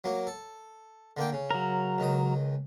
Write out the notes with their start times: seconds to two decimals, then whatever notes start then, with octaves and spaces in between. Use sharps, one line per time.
0.04 F#3 A#3
0.27 A4
1.17 D3 A#3 G5
1.32 C#3
1.51 F#3 A#4
1.98 C#2 D#3 D#6